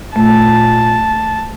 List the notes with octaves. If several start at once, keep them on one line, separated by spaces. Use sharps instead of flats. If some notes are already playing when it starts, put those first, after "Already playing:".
A#2 A3 A5